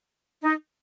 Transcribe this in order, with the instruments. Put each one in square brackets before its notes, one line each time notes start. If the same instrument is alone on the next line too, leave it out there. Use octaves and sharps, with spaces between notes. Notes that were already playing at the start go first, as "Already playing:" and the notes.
[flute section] D#4